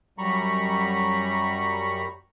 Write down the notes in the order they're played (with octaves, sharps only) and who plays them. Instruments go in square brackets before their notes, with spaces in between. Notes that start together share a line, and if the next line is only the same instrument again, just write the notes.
[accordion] F#2 G3 A#5 B5 C#6